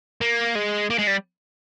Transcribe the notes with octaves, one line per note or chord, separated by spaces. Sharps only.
A#3
G#3
A#3
G#3
G3